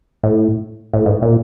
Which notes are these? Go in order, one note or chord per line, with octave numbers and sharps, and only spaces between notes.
A2
A2
G#2
A#2